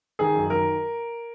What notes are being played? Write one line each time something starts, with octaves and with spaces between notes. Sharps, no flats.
D#3 G#4
F#2
D#3 A#4